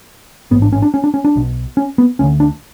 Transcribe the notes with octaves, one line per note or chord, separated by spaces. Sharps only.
A1 G#2 B3
D4
C#4
D4
C#4
D4
C#4
D4
B1 B2
C#4
B3
D2 D3 C#4
D4